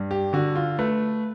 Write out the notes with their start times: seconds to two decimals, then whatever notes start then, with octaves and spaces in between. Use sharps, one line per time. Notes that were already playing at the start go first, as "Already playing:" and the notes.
Already playing: G2
0.11 G4
0.33 D3 F#4
0.55 F4
0.79 A3 B4